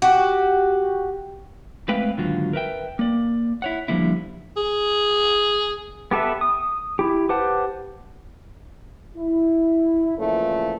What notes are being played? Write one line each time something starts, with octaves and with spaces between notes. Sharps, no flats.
F#4 G4
G#3 A3 C4 B4 F5 G5
D#2 G#2 D3 F#3 F4 F#4
A#4 B4 E5 G5
A#3 D5
E4 C#5 F#5
D3 F3 G3 A#3 E4
G#4
B3 G4 A4 B4 E5
D#6
E4 G4
G4 B4 C5 F#5 A5
E4
A#2 C#3 E3 F3 A3